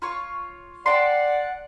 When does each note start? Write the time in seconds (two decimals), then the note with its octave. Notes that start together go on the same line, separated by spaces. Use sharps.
0.02 F4 C#5 C#6
0.86 D5 F#5 G5 A5 C6